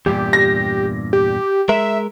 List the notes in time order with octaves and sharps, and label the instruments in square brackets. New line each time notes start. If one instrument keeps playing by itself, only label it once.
[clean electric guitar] E2 G2 A#2 [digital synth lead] G4
[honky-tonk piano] A#6
[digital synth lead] G4
[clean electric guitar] G#3 A#4 [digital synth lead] E5